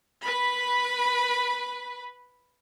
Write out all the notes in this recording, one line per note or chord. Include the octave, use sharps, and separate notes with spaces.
B4 B5